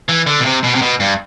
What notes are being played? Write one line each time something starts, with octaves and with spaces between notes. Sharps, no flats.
E3
D3
B2
C3
B2
C3
B2
G2